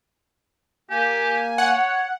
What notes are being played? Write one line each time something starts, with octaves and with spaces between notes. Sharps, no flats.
A#3 G4 G#5
C#5 F#5